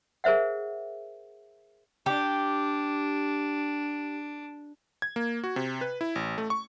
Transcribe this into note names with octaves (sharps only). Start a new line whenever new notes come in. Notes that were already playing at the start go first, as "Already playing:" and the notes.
G#4 A#4 C5 E5 F#5
D4 G4
G#6
A#3
F#4
C3
B4
E4
A1
A3
C#6